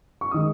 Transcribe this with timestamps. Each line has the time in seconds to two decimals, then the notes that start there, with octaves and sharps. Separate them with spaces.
0.21 C#6
0.31 D#3 G#3 D#6